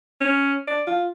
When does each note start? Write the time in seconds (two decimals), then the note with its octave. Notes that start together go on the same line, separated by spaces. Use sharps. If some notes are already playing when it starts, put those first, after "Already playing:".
0.21 C#4
0.68 D5
0.87 F4